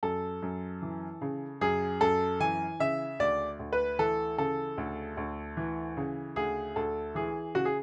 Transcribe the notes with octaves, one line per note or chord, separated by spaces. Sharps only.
F#2 A4
F#2
E3
C#3
F#2 G#4
F#2 A4
E3 G#5
C#3 E5
D2 D5
D2
B4
E3 A4
C#3 A4
D2
D2
E3
C#3
D2 G#4
D2 A4
E3 G#4
C#3 F#4
G#4